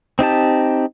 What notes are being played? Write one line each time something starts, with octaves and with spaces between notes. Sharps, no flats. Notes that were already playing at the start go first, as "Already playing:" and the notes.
C4 D#4 G4 A5